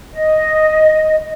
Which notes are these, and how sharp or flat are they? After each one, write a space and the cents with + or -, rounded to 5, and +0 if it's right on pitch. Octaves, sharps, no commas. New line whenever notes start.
D#5 +0